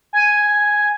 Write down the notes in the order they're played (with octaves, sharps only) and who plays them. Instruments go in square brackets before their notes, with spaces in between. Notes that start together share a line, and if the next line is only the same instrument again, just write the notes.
[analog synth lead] G#5